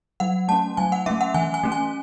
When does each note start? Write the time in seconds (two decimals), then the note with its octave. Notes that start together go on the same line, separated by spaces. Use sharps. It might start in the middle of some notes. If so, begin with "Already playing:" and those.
0.20 F#3 F#5
0.48 A3 C#4 A5
0.77 F#3 G#5
0.92 F#5
1.06 A3 C#4 E5
1.21 F#5
1.34 E3 G#5
1.54 G#5
1.63 A3 C#4
1.72 G#5